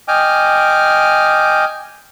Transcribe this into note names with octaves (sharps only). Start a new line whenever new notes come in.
D#5 G5 G#5 D6 F6